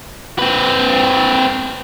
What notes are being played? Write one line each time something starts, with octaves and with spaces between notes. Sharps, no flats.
C4 B4